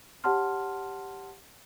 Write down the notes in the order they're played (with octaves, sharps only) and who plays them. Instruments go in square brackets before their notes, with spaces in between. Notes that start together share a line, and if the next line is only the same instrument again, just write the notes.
[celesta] G4 C#5 F#5 A5 C6 F6